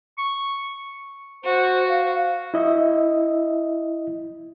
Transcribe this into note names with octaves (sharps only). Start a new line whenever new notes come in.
C#6
F#4 C5
F5
E4 D#5 E5